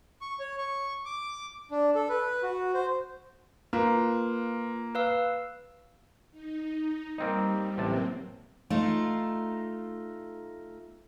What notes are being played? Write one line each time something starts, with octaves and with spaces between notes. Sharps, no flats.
C#6
C#5
C#6
D6
D4
A4
B4
F#4
C5
A#3 F4 B4
B4 F5 E6
D#4
G3 A#3 C4 D#4
A1 C3 F#3 A#3 C4 A5
A3 D#4 F4